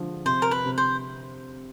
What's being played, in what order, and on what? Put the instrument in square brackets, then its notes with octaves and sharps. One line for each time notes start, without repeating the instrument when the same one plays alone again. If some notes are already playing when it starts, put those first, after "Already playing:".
Already playing: [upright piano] D3 F3
[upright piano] C3 [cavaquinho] C5
[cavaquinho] A#4
B4
[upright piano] C3
[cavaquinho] C5